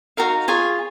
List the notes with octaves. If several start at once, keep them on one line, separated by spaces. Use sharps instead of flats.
D#4 F#4 A#4 F5
F4 G#4 C#5 G#5